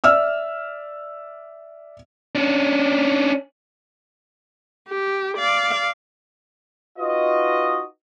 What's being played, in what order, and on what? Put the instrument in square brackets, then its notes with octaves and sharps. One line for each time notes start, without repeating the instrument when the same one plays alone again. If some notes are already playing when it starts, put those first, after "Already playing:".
[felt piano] D5 E5 E6 F6
[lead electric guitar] C#4 D4
[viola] G4
D5 F5
[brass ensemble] D#4 F4 F#4 B4 D#5